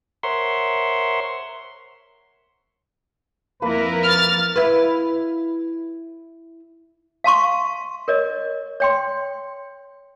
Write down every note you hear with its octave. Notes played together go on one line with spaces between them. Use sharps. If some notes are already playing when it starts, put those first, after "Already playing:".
A#4 C5 C#5 E5 F#5 C6
F2 A#3 E4 A#4 B4
F6 A6
E4 B4
F5 A5 C6 C#6
A#4 C#5 D#5
C#5 G5 C6